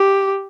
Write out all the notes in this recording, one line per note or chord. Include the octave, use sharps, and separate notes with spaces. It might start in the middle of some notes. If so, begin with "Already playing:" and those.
Already playing: G4